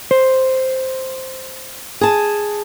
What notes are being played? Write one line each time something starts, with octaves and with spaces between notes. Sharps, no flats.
C5
G#4 A5